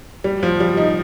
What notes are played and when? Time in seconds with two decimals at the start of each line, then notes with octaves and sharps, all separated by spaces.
0.24 G3
0.43 F3
0.60 G3
0.77 D#4